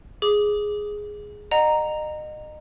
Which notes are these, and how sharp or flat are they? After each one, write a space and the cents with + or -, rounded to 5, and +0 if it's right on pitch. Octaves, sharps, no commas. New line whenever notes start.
G#4 +0 D6 +0
D#5 -30 F#5 +0 A#5 +0